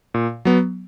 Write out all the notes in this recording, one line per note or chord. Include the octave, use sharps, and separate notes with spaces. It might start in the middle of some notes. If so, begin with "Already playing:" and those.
A#2
F#3 B3